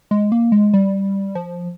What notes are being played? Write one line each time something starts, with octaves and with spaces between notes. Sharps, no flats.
G#3
A#3
G#3
G3
F3